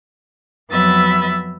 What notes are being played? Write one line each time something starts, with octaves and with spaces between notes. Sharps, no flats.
F2 F#3 B3 E5 B5 A6